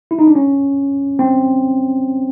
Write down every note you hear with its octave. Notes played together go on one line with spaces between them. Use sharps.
E4
D#4
D4
C#4
C4